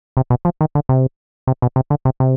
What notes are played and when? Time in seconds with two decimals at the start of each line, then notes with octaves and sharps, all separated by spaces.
0.17 C3
0.30 B2
0.45 F3
0.61 D#3
0.75 D3
0.89 C3
1.47 C3
1.62 B2
1.76 C3
1.90 D3
2.05 C3
2.20 C3